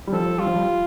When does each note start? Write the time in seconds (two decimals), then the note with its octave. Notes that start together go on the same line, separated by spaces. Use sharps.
0.07 G3
0.12 F3 A4
0.38 G3 F4
0.47 F3
0.55 G3